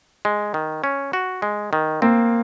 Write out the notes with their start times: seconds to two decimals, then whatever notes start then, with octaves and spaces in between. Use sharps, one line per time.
0.25 G#3
0.54 D#3
0.84 C#4
1.13 F#4
1.42 G#3
1.73 D#3
2.02 A#3 C4